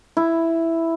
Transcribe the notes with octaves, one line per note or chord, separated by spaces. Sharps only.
E4